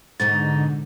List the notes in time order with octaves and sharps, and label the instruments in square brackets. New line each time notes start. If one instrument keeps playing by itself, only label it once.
[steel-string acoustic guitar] G#2 B2 D#4 [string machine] D3 [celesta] A6